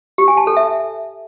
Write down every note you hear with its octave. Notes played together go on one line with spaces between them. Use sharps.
G4
G#5
A5
A4
E5